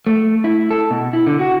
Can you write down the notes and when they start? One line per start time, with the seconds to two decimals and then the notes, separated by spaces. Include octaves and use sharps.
0.07 A3
0.44 E4
0.71 A4
0.91 B2
1.13 E4
1.26 D3
1.39 F#4